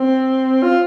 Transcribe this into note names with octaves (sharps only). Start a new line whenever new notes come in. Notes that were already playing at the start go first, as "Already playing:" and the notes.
Already playing: C4
F4